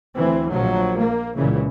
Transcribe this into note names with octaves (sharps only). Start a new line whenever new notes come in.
D2 E3 C4
A#1 F3 F#3
A#3
C#2 A#2 C#3 E3